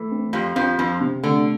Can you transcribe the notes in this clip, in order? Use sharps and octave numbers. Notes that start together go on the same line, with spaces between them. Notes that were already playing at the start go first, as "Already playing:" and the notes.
Already playing: E3 A3
C4
F2 F3 G4
F2 F3 C4
F2 F3 C4
C3
D3 A3